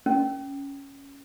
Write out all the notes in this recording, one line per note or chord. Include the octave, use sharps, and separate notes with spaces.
C#4